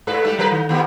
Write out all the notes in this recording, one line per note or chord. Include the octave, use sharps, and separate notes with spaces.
G#2 A4 B4
G3 A3 A4
F#3 A#4 B4
D#3
D#2 B3 G4